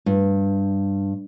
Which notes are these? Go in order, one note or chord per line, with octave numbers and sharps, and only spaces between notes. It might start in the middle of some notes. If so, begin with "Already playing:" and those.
G2